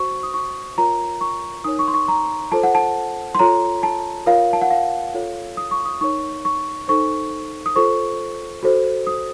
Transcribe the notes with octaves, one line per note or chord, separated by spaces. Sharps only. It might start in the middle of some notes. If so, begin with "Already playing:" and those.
Already playing: F#4 C5 C#6
D#6
C#6
F4 A#4 C#5 A#5
C#6
D#4 A#4 C#5 D#6
C#6
C6
C#6
A#5
F4 A4 C5 A5
F#5
A5
C6
F4 A4 C#5 A#5
A5
F4 A#4 C#5 F5
A5
F#5
F5
F4 A4 C#5
D#6
C#6
D#6
D#4 A#4 C#5 C#6
C#6
D#4 A4 C5 C#6
D#6
F4 A4 C5 C#6
F#4 A4 C5
D#6